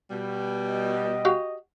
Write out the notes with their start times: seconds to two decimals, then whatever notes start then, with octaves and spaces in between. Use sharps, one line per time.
0.11 B2 G3
0.70 D#5
1.25 F#4 G4 F5